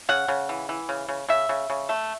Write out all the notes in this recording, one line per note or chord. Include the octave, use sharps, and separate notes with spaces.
C#3 F#5
C#3
E3
E3
C#3
C#3
C#3 E5
C#3
C#3
A3